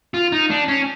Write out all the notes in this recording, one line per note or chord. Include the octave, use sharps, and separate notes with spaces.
F4
D#4
D4
C#4